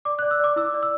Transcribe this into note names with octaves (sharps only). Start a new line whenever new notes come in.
D5 D6
D5 F#6
E6
D5 D6
E4 E6
D5
E6